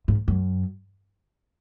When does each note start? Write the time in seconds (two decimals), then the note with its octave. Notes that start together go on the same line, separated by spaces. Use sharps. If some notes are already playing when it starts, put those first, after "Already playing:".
0.08 G#2
0.28 F#2